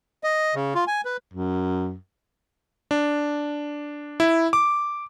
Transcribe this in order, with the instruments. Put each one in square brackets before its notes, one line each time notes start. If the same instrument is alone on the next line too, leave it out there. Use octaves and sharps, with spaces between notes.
[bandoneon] D#5
C#3
F4
G#5
B4
[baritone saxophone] F#2
[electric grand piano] D4
E4
D6